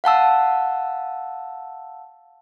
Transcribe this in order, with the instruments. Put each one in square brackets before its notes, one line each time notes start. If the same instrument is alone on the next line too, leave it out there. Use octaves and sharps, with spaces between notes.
[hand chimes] F5 F#5 A5 E6